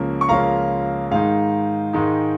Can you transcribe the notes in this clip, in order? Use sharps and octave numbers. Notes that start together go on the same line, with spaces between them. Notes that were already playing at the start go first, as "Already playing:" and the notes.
Already playing: C#2 C#3 F3 A#3 C#4
C#6
C#2 C#3 F3 A#3 C#4 F5 A#5
G#2 D#3 G#3 D#4 F5
G#2 D#3 G#3 D#4